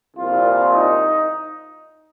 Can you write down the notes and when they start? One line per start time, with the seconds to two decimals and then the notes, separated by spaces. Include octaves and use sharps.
0.17 C2 A#2 F3 F4
0.73 D#4